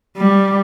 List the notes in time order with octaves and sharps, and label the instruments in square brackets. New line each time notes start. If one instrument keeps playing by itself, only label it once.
[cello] G3